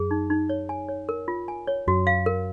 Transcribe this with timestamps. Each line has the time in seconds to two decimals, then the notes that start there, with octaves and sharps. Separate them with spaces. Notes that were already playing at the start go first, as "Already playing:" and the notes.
Already playing: F#2 G#4
0.11 D#4
0.30 D#4
0.49 C#5
0.69 G#5
0.89 C#5
1.09 A#4
1.28 F4
1.48 G#5
1.67 C#5
1.87 F#2 F#4
2.07 F5
2.26 A#4